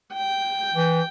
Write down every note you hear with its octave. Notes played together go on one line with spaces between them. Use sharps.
G5
E3